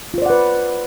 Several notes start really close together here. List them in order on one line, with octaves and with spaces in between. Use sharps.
F4 C5 D5 F#5 B4